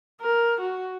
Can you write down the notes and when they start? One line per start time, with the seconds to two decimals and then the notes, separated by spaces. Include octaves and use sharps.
0.21 A#4
0.61 F#4